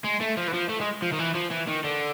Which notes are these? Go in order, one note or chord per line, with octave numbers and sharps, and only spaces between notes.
G#3
A3
F3
E3
F3
A3
G#3
F3
D#3
E3
F3
E3
D#3
D3